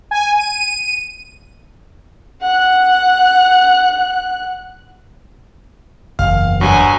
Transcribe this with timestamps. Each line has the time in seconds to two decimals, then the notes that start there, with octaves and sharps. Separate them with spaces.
0.11 G#5
0.39 D#7
2.41 F#5 F#6
6.19 F#1 E2 F5 F6
6.61 G2 F#3 G#5